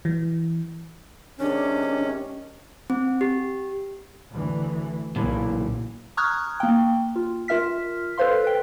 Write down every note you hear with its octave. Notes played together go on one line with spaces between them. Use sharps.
E3
C3 D#3 G#3 C#4 D4
C4
G4
D2 E3
B1 A#2 C#3 E3
A#5 C#6 D#6 F6 F#6 G#6
A#3 G5
F4
F4 A#4 E5 F6 B6
A4 B4 C5 F5 C6
B4 G5